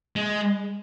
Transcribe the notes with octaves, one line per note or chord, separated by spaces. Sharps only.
G#3